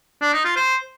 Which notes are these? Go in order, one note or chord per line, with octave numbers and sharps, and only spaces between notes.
D4
D#4
F4
C5